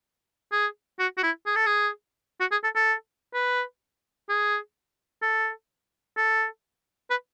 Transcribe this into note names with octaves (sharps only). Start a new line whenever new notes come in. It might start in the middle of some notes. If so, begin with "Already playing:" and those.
G#4
F#4
F#4
E4
G#4
A4
G#4
F#4
G#4
A4
A4
B4
G#4
A4
A4
B4